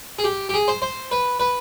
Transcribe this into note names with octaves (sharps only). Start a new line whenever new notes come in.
G#4
G4
G4
G#4
C5
C5
B4
B4